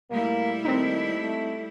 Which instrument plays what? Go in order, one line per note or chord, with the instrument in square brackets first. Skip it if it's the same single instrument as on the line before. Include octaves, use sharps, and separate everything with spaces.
[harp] A#2 A3 [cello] G3 E4 [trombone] A#3
[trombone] D#3 [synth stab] C4 D#4 [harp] A4 D#5 F#6
[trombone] A3